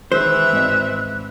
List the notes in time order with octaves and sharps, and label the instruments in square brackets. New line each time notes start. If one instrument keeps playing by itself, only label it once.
[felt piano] D#3 G#3 [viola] E3 E5 [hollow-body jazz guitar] C5 [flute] F#6
[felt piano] G#1 D5 D#5